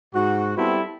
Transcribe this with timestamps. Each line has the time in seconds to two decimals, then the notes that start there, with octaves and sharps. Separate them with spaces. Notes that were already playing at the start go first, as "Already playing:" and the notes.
0.14 G#2 F#4
0.58 G3 B3 C4 E4 A4